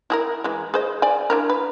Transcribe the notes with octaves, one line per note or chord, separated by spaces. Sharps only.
E4 G#4 A#4
E3 G#3
G#4 C5 D#5
D5 G5 G#5
D4 E4 A#4
B4